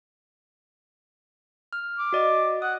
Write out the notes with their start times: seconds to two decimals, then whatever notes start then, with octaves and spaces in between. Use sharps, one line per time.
1.73 F6
1.99 D6
2.13 F#4 D5 D#5
2.62 F#5 D#6